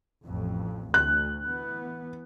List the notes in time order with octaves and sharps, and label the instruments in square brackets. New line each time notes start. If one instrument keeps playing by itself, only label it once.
[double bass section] A1 F2
[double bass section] D2 [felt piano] F#6
[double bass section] E3 B3